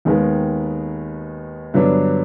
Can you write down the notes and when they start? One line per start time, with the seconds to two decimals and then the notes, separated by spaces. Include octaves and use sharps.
0.05 D#2 D#3 G#3 B3
1.74 G2 D3 F#3 B3 D4